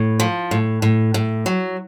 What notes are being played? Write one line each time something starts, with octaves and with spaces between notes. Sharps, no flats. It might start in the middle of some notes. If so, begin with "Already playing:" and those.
Already playing: A2
F3
A2
A2
A2
F#3